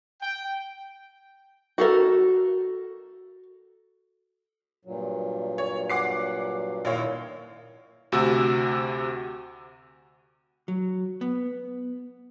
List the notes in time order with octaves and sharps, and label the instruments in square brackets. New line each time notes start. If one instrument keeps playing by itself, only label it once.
[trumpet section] G5
[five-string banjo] F#4 A4 A#4
[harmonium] G2 A#2 F#3
[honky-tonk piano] C#5
F#5 D6 C7
[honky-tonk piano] A#1 C#5 F5 [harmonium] D#3 E4
[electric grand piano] D2 C3 F#4 E6
[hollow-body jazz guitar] F#3
B3